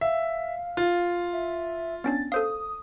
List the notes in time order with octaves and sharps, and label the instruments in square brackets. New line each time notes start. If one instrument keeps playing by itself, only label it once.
[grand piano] E5 [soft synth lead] F5
[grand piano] F4
[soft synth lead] E5
[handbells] B3 C#4 D4 [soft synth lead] A6
[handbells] A4 C5 F5 [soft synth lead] D#6